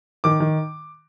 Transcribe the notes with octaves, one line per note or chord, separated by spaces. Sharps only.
D#3 D6
D#3